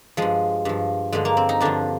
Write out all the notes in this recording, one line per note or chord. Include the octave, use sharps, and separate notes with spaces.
G2 F3 G#3
G2 F3
G2 D3 F3 G#3
A#3
C4
D#4
G2 D3 F3 D4